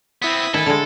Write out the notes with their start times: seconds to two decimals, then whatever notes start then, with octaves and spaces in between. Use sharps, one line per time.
0.22 B3 C4 E4 D#6 B6
0.54 D#3 E4 A4 G#5
0.66 D3 G#3 A6